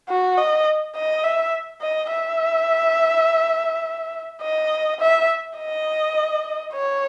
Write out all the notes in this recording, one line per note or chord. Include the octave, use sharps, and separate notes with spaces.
F#4
D#5
D#5
E5
D#5
E5
D#5
E5
D#5
C#5